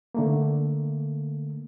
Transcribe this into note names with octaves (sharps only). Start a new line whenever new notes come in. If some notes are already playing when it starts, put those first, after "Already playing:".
D3 A3 A#3